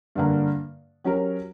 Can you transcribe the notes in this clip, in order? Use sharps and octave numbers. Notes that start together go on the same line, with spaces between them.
G2 D3 A#3
F#3 C#4 G4 A#4